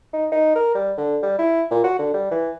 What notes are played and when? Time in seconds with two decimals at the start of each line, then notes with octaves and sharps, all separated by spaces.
0.13 D#4
0.32 D#4
0.55 A#4
0.75 G3
0.97 D3
1.23 G3
1.39 E4
1.71 A#2
1.84 F#4
1.99 D3
2.14 G3
2.31 E3